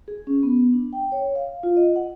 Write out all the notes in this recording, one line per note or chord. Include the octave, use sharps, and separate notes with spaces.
G#4
C#4
B3
D4
G5
C#5
F5
F4
D#5
F#5